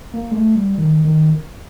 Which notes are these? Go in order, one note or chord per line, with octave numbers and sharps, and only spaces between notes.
A#3
G#3
A3
G3
D#3
D#3